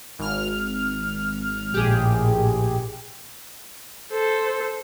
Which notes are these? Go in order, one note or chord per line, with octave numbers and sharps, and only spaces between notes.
G#1 F6
A#1 A2 G4 G#4
A4 C5